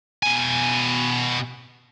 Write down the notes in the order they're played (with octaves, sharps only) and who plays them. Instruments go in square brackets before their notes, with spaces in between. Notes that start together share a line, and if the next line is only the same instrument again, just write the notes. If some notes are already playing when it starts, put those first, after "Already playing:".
[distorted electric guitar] B2 G#5